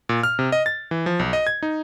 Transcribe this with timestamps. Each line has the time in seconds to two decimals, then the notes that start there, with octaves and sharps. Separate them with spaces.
0.09 A#2
0.23 F6
0.39 C3
0.52 D#5
0.66 A6
0.91 E3
1.06 F3
1.19 B1
1.33 D#5
1.47 G#6
1.63 D#4